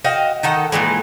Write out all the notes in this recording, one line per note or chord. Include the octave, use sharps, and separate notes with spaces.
F#4 D#5 F5 G5
D#3 D#4 A4 F#5
A#2 D3 E3 G#3